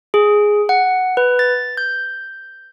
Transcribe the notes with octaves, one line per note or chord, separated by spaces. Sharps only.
G#4
F#5
B4
A6
G6